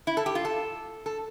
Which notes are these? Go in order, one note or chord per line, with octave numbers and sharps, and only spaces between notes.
E4
A4
G4
F4
A4
A4